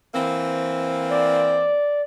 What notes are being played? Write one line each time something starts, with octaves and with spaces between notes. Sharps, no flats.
E3 A#3 C4
D5